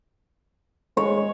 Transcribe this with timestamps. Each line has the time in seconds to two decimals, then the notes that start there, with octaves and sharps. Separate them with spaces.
0.97 G#3 C#5